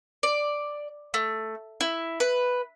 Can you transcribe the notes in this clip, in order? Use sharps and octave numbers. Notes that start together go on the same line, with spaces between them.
D5
A3
E4
B4